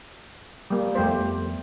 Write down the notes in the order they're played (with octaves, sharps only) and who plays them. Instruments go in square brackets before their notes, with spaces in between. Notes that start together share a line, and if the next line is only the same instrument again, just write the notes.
[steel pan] G3 A#3
[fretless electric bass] F2 B3 [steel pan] A3 G4 C5